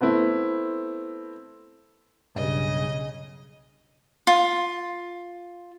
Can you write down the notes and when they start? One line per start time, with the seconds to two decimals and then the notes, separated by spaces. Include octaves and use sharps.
0.01 A3 B3 C4 E4
2.36 B1 G2 C#3 D#5
4.27 F4